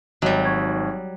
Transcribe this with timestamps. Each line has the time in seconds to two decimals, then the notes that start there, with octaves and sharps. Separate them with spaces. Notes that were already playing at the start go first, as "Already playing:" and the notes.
0.22 G#1 F#3 G3 C#5 D#5
0.45 D#4 C#6 G#6